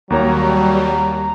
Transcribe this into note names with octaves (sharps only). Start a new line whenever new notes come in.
D#2 F#3 G3 A#3 C#5 A#5